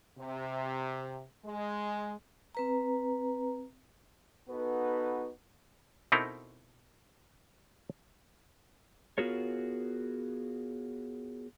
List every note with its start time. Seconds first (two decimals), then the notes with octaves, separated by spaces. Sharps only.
0.19 C3
1.45 G#3
2.55 C4 B4 A#5
4.50 B3 D#4 F#4 A4 B4
6.12 B2 C4 D#4 E4 A4 A#4
9.18 B3 F4 F#4 G#4 A#4 C#5